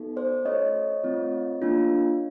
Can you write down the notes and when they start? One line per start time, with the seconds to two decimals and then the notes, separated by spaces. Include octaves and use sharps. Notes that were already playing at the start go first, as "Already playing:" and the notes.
Already playing: B3 D#4 F#4 A4
0.16 C5 D5
0.45 A3 C#4 F#4 A4 C#5 D#5
1.04 A3 C4 F4
1.62 A#3 D4 F4